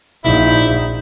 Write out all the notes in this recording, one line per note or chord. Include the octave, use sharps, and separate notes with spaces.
A#1 D#4 E4